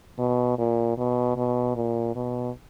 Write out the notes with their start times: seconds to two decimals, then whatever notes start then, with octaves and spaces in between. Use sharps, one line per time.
0.19 B2
0.58 A#2
0.98 B2
1.37 B2
1.76 A#2
2.16 B2